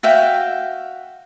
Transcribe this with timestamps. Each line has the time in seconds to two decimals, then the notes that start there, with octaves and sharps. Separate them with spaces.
0.03 F#4 E5 F5 G5